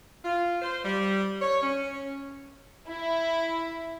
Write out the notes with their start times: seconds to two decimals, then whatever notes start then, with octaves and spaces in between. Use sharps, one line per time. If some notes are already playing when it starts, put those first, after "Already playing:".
0.24 F4
0.61 C5
0.84 G3
1.42 C#5
1.61 C#4
2.88 E4